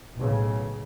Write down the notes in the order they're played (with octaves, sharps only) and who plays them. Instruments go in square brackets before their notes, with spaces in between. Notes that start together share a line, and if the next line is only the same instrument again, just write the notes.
[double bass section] B1 A2 C#3